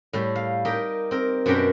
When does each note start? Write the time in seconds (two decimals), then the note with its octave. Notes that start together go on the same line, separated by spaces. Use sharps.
0.13 A2 G3
0.36 F5
0.65 D#4 G4 A#4
1.11 C4 A#4
1.46 F#2 B2 D4 G4 A#4 G5